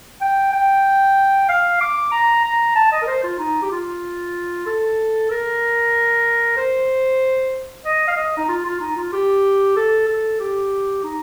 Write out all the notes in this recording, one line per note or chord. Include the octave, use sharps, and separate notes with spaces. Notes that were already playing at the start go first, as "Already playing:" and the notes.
G5
G5
F5
D6
A#5
A#5
A5
D#5
A#4
C5
F4
D#4
G4
F4
A4
A#4
C5
D#5
F5
D#5
D#4
F4
F4
D#4
F4
G4
A4
A4
G4
D#4